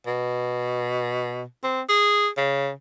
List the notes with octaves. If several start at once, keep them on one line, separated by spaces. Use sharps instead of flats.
B2
C4
G#4
C#3